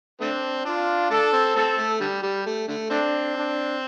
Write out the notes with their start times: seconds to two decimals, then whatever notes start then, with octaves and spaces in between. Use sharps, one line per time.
0.20 A3 C4 D4
0.65 D4 F4
1.10 A3 D4 A4
1.33 C4
1.55 A3 C4 A4
1.78 A3
2.00 D3 G3
2.23 G3
2.46 A3
2.68 D3 A3
2.90 A3 C4 D4
3.36 D4